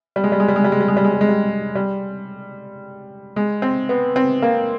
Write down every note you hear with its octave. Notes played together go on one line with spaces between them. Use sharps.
G3
G#3
G3
G#3
G3
G#3
G3
G#3
G3
G#3
G3
G#3
G3
G#3
G3
G3
G#3
C4
B3
C4
A#3